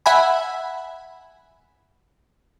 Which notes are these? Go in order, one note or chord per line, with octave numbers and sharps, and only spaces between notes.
E5 F#5 G#5 B5